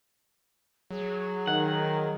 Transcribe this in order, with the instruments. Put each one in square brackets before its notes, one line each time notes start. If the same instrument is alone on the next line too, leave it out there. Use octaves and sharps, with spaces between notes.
[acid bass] F#3 [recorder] G#4
[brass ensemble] D#3 [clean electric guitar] F#5